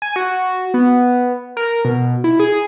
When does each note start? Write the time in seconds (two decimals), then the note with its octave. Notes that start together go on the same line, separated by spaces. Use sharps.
0.02 G#5
0.16 F#4
0.74 B3
1.57 A#4
1.85 B2
2.24 E4
2.40 G#4